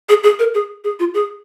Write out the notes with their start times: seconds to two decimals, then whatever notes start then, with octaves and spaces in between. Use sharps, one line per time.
0.09 G#4
0.24 G#4
0.39 A#4
0.54 G#4
0.84 G#4
1.00 F4
1.14 G#4